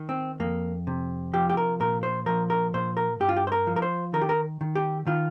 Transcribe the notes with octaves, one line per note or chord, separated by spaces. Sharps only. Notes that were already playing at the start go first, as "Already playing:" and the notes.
Already playing: D#3
C4
F2 A#3
C3
F3 G4
G4
A#4
A#2 A#4
C5
F3 A#4
A#4
A#2 C5
A#4
G2 G4
F4
G4
C5
A#4
F3
A#4
C5
D#3 A#4
G4
A#4
D#3
G4
D#3 F4